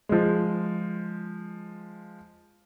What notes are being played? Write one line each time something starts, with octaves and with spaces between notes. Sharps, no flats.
F3 G#3